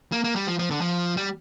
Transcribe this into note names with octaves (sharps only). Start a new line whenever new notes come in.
A#3
A#3
G3
F3
F3
D3
F3
G3